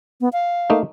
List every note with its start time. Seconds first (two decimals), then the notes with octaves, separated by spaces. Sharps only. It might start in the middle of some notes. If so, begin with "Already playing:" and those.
0.21 B3
0.33 F5
0.70 A3 A#3 D#4